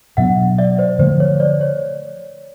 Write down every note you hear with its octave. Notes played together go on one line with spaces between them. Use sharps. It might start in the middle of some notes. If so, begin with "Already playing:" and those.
B2 F#3 B3 D4 E5 F#5
D5 E5
C5 D5
D3 F3 A3 C5
C#5
C5 D5
C#5